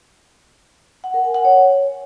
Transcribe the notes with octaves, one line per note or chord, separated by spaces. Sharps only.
F#5
A#4
G#5
F#5
C#5